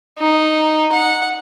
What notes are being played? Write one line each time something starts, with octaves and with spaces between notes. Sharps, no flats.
D#4
F#5